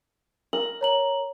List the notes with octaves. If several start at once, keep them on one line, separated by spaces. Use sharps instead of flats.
A#4 F#7
C#5 A#5 F#7